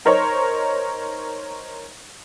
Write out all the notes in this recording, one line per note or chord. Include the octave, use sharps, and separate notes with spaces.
D#4 A#4 C5 C#5